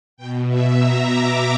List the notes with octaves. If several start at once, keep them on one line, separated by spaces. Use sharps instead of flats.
B2 G5
E5
A#5
D6